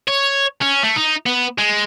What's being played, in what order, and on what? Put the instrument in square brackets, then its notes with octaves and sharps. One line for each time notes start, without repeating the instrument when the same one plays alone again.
[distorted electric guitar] C#5
C#4
A3
D#4
B3
G#3